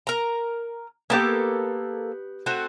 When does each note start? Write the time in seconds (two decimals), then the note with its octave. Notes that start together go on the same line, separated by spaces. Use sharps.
0.07 A#4 A#5
1.10 A#3 B3 G4 A4
2.46 A3 C4 F#4